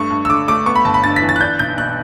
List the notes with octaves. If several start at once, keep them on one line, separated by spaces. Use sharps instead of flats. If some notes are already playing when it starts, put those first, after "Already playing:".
Already playing: G2 A3 C#6
G2
E6
D3 D6
A3 D6
B3 C#6
B5
G1 A5
B5
G2 A6
B6
E3
A6
F#6
D4 G6
B1 G6
B2 F#6